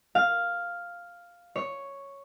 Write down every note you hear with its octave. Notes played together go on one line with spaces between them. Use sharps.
F5
C#5